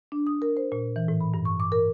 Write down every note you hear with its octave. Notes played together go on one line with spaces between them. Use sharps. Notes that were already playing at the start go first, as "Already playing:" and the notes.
D4
D#6
A#4
C5
A#2
E3
A2
B5
G2
C#6
D6
A#4